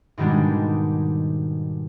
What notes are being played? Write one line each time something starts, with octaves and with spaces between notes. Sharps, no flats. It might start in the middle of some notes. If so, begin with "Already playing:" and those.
G#2 B2 D#3 G3 G#3 D4